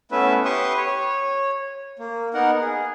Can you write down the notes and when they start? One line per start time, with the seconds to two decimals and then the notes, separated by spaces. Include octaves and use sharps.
0.12 A3 B3 C#4 E4 B4 E5
0.45 G4 B4 C6 C#6 D#6
0.77 C#5
1.99 A#3
2.34 B3 D#4 A#4 F#5
2.61 G#4